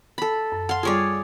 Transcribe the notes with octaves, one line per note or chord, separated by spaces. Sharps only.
A4 B5
F#2
F5 F#5 C6
G3 F4 G#4 C#5 D5